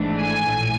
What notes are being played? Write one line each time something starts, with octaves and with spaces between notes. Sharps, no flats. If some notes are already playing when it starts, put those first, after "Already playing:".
Already playing: G#1 G#2 E3 A3 D4
G#5
A#1 A2